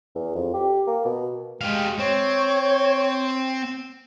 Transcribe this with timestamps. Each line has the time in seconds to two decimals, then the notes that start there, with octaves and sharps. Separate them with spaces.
0.15 E2
0.35 F2
0.54 G4
0.87 A#3
1.05 B2
1.61 G#3 G4 F5
1.99 C4 C#5